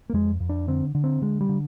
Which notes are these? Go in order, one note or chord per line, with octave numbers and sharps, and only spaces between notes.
A#3
F2 G#3
F2
D4
D3 C4
D3
C4
D3 G#3
G3
D3